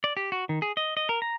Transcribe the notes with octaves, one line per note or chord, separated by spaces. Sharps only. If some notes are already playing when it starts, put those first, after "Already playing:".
D5
G4
F#4
D#3
G#4
D#5
D#5
A#4
A#5